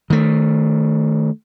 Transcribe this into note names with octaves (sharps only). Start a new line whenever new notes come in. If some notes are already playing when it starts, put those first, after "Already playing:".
D#3 A3